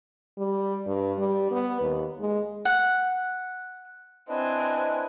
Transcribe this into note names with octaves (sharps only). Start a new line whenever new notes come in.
G3
G2
G3
B3
D#2
G#3
F#5
C4 D4 E4 B4 D#5 G#5